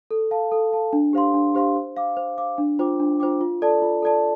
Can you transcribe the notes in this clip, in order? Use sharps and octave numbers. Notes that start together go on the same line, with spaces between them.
A4
F5 A5
A4
F5 A5
D4
G4 C5 F5 C6
D4
G4 C5 F5 C6
C5
F5 D6
C5
F5 D6
D4
F4 C5 G5 D6
D4
F4 C5 G5 D6
F4
A4 D5 A5
F4
A4 D5 A5